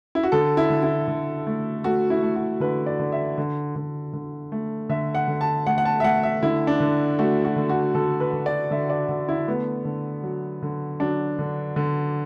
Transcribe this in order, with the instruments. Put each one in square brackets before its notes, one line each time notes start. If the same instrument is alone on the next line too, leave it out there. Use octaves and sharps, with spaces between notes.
[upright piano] E4
F#4
D3 A4
E4
D3
E4
D3
A3
A3 F#4
E4
A3
F#4
D3 B4
D5
D3
E5
D3
D3
D3
A3
D3 E5
F#5
D3
A5
A3 F#5
F#5
A5
E5
A3 F#5
E5
D3 E4
D4
D3
A3 F#4
F#4
D3
F#4
D3 A4
B4
D3
D5
D3 E5
D5
D3
E4
A3 B3
D3
F#3
D3
F#3 D4
D3
D3